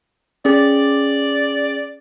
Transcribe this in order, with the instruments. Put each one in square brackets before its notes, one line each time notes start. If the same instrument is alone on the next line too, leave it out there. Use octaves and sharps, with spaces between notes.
[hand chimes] C#4 G#4 [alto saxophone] D5